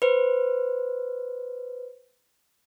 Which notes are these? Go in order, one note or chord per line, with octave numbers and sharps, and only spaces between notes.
B4 C5